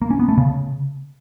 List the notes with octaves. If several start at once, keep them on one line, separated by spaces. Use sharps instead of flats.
A#3
C#4
B3
A3
C#3